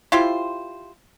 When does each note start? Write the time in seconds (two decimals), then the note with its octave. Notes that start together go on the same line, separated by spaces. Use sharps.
0.12 E4 F4 G4 C5